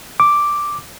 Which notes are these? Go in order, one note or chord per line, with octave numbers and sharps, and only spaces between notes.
D6